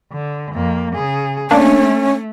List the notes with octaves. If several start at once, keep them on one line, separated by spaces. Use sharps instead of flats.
D3
F2 A#3
C#3 G#4
A3 A#3 C#4 D4